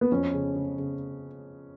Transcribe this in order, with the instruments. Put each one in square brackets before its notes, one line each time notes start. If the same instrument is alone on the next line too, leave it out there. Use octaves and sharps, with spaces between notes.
[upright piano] B3
[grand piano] F2 [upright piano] C#4
[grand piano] C#3
C#3
C#3